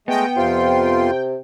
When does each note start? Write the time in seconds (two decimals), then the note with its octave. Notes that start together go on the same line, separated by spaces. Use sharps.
0.08 G#3 A3 B3 D#5 G5
0.37 F2 C3 F4 C6